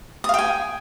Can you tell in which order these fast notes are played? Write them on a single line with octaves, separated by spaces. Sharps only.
D#6 F5 G5 G#5